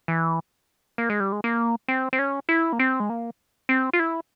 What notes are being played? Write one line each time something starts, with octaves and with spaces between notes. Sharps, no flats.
E3
A#3
G#3
G3
G#3
A#3
C4
C4
C#4
E4
A#3
C4
G#3
A#3
C4
F4
E4